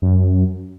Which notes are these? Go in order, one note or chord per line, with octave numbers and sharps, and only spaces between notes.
F#2